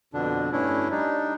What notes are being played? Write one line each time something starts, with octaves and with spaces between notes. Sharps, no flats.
F2 B2 D3 D4
G2 A3 C#4 D4 E4
G3 D4 D#4